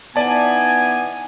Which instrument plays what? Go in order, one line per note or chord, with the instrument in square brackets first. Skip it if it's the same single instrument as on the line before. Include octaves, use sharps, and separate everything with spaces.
[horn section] E3 D#4 G#5 [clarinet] B3 [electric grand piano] D5 A5